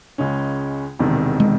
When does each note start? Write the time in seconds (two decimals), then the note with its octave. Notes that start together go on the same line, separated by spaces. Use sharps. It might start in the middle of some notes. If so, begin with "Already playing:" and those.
0.18 C#2 C#3 G#3 C#4
0.99 E1 E2 C3 D#3
1.40 G#3